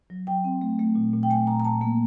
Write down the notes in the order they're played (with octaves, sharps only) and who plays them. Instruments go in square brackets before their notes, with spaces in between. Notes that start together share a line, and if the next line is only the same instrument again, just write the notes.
[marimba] F#3
F#3 G5
C4
A3
A3
A#2
A#2
G5
A3 G#5
A#2 A#5
A#5
A#2 A5
A#3